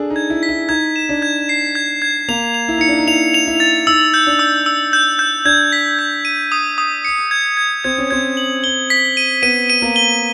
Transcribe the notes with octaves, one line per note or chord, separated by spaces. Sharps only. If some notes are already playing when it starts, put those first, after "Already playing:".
Already playing: D4 G#4 A4
D#4
G#6
E4
B6
E4
D#4 G#6
E7
D4
G#6
C7
G#6
G#6
A#3 F7
F7
E4
D#4 C#7
D4
D#4
E4 F7
F7
E4
A6
D#4 E6
G6
D4
E6
E6
G6
G6
D4 G#6
B6
G#6
D#7
D#6
D#6
C#7
G#6
G#6
C4 G#6
C#4
C4 G#6
F#7
G7
B6
D#7
B3 D#7
D#7
A#3
G7